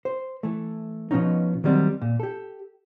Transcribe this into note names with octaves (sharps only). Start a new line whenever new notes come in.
C5
E3 A3
B2 F3 B3 C#4 D#4
D#3 F#3 G3 A#3 C4
A#2
G4 A4